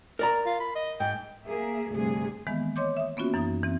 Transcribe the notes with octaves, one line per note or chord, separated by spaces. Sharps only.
A#4 D5 A#5
F4
B5
D#5
G#2 G5
A#3 G#4 A#4 E5
D2 G2 C3 G#4
D#3 E3 G#3 A#3 B3
C#5 D#5 C6 D6 G6
E5 D#6
A#3 B3 C#4 F4 F#4
F#2 E3 D#4 D#6
E3 C4